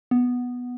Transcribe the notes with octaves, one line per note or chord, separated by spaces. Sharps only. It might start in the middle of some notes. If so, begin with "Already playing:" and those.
B3